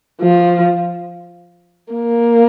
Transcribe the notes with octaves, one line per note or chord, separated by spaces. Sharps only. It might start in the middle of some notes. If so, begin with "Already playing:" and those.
F3
A#3